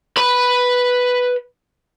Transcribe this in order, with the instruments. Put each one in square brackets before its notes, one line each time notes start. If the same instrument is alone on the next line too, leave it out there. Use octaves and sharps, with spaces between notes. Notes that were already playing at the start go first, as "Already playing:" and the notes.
[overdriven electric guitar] B4 B5